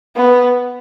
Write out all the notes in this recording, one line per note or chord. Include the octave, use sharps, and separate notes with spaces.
B3